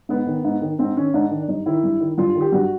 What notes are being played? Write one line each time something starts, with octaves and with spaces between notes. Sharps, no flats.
G#2 B3
D#3
G#2
D#3
G#2 C4
D#3 C#4
G#2 D4
D#3
G2 D#4
D#3 E4
G2
D#3
G2 F4
D#3
G4
G2 F#4